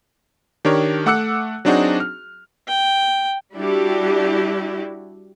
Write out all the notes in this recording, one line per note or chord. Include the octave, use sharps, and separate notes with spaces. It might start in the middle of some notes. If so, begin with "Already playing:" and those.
D#3 D4 G4 A#4 C#5
A3 F#5 D6 E6 F#6 C#7
F#3 C4 D4 D#4 F#4 G#4
F6
G5
G3 D4 E4 F#4 G4